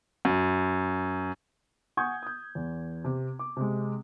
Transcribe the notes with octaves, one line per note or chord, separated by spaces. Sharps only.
F#2
F#5 G#5 C#6 D#6 G6 G#6
D#6 G6
E2
C3
D6
C3 G#3